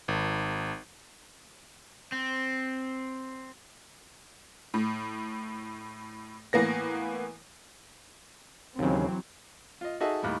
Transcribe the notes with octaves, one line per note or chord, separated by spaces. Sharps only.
G#1
C4
A2
A2 E3 A#3 B3 A#6
D#2 C#3 E3 F#3 C4
F4 D#5
D#4 F#4 G#4 A4 D#5 E5
D#2 A2 D#3 G3